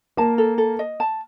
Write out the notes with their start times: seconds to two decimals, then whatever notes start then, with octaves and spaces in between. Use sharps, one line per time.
0.17 A#3 A#4 A5
0.38 A4
0.58 A4
0.79 D#5
1.00 A5